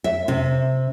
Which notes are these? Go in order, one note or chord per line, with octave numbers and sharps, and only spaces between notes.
E5
C3